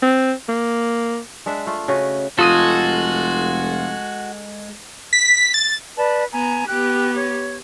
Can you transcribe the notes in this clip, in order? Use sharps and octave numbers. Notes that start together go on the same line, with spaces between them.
C4
A#3
G#3 D4 E5 F#5
A3 F4
C#3 F#4 D#5
F1 G#3 F4 F#4 A4 D#6 D#7
B6
A6
B4 D5 A5
B3 G#5 A#5
B3 G4 G5 F#6
C#5